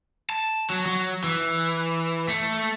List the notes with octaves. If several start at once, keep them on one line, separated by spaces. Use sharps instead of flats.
A5
F#3
F#3
E3
A3